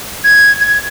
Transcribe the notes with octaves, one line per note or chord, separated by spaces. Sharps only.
G#6
G#6